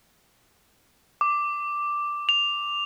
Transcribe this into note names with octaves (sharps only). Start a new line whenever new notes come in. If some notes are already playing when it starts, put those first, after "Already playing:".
D6
F7